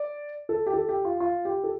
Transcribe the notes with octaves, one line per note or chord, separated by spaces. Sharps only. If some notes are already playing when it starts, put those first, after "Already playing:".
Already playing: D5
A4
G4
A4
G4
F4
F4
G4
A4